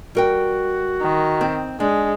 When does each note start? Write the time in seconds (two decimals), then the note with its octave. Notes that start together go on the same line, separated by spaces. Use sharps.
0.15 G3 F#4 A#4 G5
1.01 D#3
1.41 C4
1.80 G#3 D4